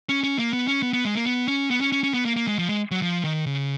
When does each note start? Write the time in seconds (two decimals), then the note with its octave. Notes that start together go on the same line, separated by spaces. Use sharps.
0.09 C#4
0.24 C#4
0.38 A#3
0.53 B3
0.67 C#4
0.82 B3
0.93 B3
1.05 G#3
1.15 A#3
1.26 B3
1.48 C#4
1.70 B3
1.81 C#4
1.92 C#4
2.04 C#4
2.14 B3
2.25 A#3
2.36 A#3
2.47 G#3
2.59 F3
2.69 G#3
2.91 F#3
3.02 F3
3.24 D#3
3.46 C#3